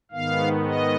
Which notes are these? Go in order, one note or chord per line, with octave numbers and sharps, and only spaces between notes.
G#2 D#3 B3 F5
D#5